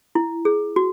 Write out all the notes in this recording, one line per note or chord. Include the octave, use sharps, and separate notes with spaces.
E4
G#4
F#4